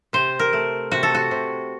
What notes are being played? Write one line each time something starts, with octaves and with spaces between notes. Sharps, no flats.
C3 C5
A#4
A3
C3 F#4
A4
F#4
C3